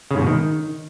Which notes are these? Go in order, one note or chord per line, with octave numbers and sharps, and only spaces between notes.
C#3
G#2
B2
D#3